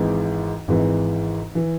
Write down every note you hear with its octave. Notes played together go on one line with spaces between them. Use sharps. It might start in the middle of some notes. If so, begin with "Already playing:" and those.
Already playing: G#1 G#2 E3
G#1 G#2 E3
E3